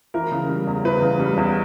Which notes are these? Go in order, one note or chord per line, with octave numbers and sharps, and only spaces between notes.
E3 A#4
C#3
G3
E2
E3 B4
C#3
G3
E2